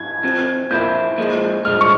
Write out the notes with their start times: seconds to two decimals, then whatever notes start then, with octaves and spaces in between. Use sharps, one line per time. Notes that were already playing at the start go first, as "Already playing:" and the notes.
Already playing: G#6
0.23 F2 C3 F3
0.71 A#2 F3 A#3 E4 G6
1.18 A#2 F3 G#3
1.65 G2 F3 G#3 F6
1.81 C#6